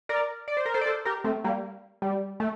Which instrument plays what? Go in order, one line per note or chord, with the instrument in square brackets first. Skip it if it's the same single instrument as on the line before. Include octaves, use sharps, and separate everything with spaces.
[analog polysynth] A#4 D5
D5
C5
A#4
A4 C5
D5
A4 C5
G4 A#4
A3 C4
G3 A#3
G3
A3